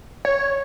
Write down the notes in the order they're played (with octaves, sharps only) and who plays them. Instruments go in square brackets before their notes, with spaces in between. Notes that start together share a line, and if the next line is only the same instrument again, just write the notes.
[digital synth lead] C#5